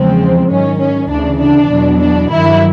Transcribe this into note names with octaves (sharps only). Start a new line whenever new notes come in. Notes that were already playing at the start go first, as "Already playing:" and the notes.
Already playing: E2 C#3 F3 G#3 C4
G#2 D#3 F#3 C#4
C#4
D2 C#3 E3 D4
D4
E2 B2 F#3
D4
G2 D#3 F#3 E4